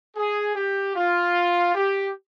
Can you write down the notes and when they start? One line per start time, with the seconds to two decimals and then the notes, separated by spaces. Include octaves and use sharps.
0.16 G#4
0.56 G4
0.95 F4
1.75 G4